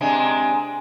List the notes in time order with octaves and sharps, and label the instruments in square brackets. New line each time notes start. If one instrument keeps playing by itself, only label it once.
[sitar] C3 G#3 D4 [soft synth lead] G#5